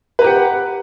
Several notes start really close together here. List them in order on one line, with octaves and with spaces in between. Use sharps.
B4 A#5 G4 F#5